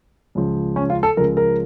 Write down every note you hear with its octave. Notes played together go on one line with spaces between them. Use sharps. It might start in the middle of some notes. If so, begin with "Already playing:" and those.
C#2 C#3 F3
C#4
F4
A4
C#2 C#3 F3 A#4
A#4